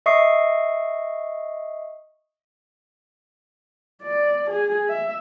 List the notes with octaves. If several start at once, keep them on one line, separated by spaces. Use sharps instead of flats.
D#5 E5 C#6 D#6 C7
D5
G#4
E5